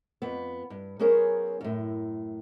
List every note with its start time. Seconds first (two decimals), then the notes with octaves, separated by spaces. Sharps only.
0.22 F2 B3
0.70 G2
0.99 F#3 B3 C#4 G#4 A#4 C5
1.61 F#2 A2